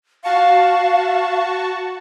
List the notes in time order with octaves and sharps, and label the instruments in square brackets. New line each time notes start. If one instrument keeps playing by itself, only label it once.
[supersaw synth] F#4 A5 C#6 [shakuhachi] F5